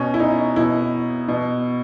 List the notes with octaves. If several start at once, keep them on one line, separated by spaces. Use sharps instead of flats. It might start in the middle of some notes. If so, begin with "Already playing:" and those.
Already playing: B2 C#4
E4
D#4
B2 E4
B2